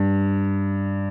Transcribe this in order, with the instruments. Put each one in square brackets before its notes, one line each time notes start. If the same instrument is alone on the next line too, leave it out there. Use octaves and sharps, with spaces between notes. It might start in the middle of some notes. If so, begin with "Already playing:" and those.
Already playing: [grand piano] G2